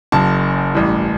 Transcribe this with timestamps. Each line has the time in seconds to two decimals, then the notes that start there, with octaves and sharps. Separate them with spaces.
0.12 F#1 F#2 C#3 A5
0.74 A1 G2 E3